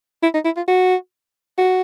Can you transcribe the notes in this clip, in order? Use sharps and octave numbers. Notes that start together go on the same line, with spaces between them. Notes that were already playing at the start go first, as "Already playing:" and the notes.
E4
D#4
E4
F4
F#4
F#4